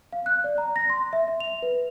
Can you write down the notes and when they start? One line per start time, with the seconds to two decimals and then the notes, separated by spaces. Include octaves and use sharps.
0.13 F5
0.26 F#6
0.44 D5
0.58 A#5
0.76 A#6
0.90 C6
1.13 E5
1.28 E5
1.40 F7
1.62 B4